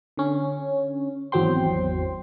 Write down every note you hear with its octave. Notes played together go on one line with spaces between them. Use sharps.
D3 C#4
G#1 E2 F#3 C4 G5 C6